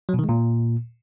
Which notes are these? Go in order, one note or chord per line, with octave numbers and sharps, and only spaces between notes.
F#3
B2
D#3
G#3
A#2